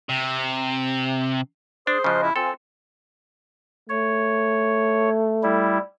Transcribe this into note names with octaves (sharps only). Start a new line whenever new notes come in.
C3
D4 G#4 C5 D#6
C#3 F3 F#4 D#5 F#6
E4
C4 F4 A4 C5 G#5
A3 C#5
G3 E4